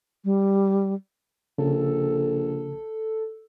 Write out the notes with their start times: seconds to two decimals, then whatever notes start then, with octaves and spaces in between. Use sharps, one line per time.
0.25 G3
1.58 A#1 C#3 A4